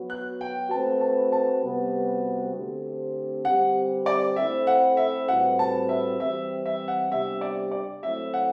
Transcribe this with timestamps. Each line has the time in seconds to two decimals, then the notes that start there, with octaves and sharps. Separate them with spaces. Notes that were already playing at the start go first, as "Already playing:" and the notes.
Already playing: F#3 B3 F#4
0.10 F#6
0.41 G5
0.71 A3 C4 F#4 B4 A5
1.01 A5
1.32 A5
1.63 C3 G3 B3 F#4 B4
2.54 D3 A3 C4 G4 C5
3.45 D3 G3 C4 G4 B4 F#5
4.06 D5
4.36 A3 C4 E4 A4 C5 E5
4.67 F#5
4.97 E5
5.28 A2 G3 C4 F#4 B4 F#5
5.59 A5
5.89 E5
6.19 E3 G3 C4 E5
6.66 E5
6.88 F#5
7.10 C3 G3 B3 D4 G4 E5
7.41 D5
7.71 D5
8.03 F#3 A3 C4 E4 A4 E5
8.34 F#5